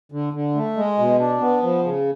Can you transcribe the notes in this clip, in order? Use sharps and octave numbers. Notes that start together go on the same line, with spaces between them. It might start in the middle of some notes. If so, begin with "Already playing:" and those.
D3
D3
A3
G#3
B2
D4
B3
F3
C#3